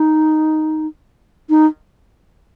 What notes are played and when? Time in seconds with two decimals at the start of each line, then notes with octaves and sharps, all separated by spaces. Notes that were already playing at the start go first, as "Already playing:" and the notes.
Already playing: D#4
1.50 D#4